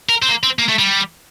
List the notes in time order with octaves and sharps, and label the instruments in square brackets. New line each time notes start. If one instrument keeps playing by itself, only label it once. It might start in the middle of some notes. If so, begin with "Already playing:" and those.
[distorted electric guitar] A#4
C4
A#3
C4
A#3
A3
G3